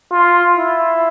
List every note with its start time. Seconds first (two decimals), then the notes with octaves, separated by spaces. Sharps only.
0.12 F4
0.57 E4